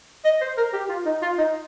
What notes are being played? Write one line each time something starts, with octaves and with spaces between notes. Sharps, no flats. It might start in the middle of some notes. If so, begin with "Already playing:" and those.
D#5
C5
A#4
G4
F4
D#4
F4
D#4